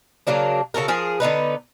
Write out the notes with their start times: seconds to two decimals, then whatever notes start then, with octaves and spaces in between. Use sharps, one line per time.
0.27 C#3 F#3 A#3 D4
0.74 C#3 F#4 A4 A#4
0.88 F3 G#4 A#4
1.20 D3 B3 D#4 B4